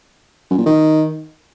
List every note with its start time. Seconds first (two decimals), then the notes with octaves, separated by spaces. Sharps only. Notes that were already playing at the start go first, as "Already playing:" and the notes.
0.50 F#2
0.58 A#2
0.66 D#3